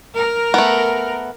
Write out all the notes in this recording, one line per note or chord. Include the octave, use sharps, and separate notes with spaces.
A#4
A3 B3